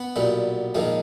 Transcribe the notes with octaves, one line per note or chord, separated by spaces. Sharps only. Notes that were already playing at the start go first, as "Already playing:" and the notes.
Already playing: B3 B4
B1 A#2 G3
A#1 G#2 D#3